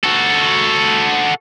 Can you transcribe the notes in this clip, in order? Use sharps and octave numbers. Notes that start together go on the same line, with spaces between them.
F#4 A4